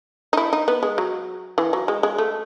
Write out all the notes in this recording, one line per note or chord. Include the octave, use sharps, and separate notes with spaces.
D#4
E4
D#4
B3
G#3
F#3
E3
F#3
G#3
G#3
A3